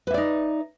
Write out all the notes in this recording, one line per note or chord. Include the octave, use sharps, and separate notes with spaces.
D#4 B4 D5 E5